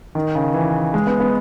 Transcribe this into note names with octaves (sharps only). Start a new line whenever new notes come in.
D#3
C#3
E3
G#3
B3
B3